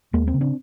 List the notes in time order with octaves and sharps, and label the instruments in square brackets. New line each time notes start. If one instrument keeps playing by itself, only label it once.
[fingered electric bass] D#2 G#3 A#3
A#3 C4
C#3
C4 D4